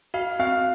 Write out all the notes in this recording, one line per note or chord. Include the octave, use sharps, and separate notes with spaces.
F#4 F5
C4 F5